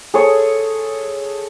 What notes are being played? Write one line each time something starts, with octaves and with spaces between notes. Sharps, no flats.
G#4 A4 C#5 G#5